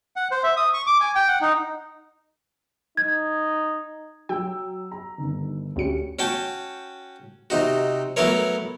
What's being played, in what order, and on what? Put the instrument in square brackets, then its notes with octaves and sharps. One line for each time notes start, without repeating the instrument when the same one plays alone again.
[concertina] F#5
C5
E5
D#6
C#6
D6
G#5
G5
F#5
D#4
[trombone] D#4 [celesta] G#6
[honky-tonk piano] F#3 E6 [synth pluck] G5
[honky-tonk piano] A#5
G1 D#3
[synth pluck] D2 C#7 [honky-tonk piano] C#4 F#4 G4
[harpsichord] C#4 F#4 G5 A5
C3 D#4 F#4
F#3 A3 B3 E4 A#4 C#5